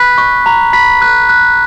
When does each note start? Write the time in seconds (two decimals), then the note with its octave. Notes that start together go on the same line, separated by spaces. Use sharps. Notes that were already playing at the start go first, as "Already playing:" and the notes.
Already playing: B5 F#6 B6
0.18 C#6
0.46 A#5
0.73 B5 B6
1.02 F#6
1.29 F#6